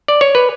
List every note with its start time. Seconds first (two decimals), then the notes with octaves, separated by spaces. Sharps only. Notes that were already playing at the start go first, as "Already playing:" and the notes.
0.08 D5
0.21 C#5
0.35 B4